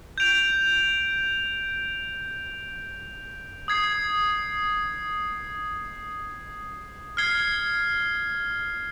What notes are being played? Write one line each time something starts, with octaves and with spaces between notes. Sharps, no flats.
G6 D7 F7
D#6 G#6 C7
F6 G#6 C7 G7